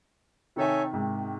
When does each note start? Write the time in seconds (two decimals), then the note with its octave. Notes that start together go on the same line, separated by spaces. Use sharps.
0.56 C3 D#3 D#4 A4 C#5 E5 G#5
0.93 G#2 C3